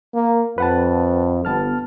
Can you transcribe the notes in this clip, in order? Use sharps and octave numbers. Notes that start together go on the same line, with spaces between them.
A#3
F2 B4 F#5 A5
G1 B3 A5 F6